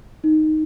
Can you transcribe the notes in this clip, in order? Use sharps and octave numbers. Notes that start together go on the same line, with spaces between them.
D#4